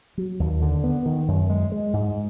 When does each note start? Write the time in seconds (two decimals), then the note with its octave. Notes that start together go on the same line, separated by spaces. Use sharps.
0.18 F#3
0.40 D#2
0.62 D3
0.84 B3
1.06 D#3
1.28 F#2
1.49 G#3
1.72 G#3
1.93 G#2